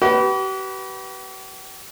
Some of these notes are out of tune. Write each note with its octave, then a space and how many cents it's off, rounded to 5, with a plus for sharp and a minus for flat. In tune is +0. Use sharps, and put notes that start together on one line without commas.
G4 -45 B4 -10